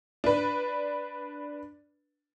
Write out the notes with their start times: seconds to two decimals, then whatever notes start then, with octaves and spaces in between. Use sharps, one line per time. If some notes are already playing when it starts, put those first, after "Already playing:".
0.24 D4 B4